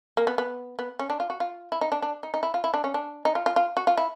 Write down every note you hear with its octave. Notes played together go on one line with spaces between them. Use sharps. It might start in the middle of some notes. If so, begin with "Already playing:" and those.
A#3
B3
B3
B3
C#4
D4
F4
F#4
F4
E4
D#4
D4
D4
D#4
D#4
E4
F4
E4
D4
C#4
D4
D#4
F4
F4
F4
F#4
F4
E4